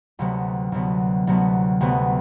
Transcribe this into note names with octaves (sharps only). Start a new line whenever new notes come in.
D2 C3 F#3 B3
D2 C3 F#3 B3
D2 C3 F#3 B3
D2 C3 F#3 B3